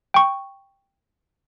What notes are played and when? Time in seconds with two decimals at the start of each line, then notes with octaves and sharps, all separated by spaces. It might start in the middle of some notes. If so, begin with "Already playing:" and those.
0.14 G5 C#6